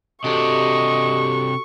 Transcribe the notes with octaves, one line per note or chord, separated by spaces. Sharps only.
C3 D4 F#4 G4 A4 D#5 C#6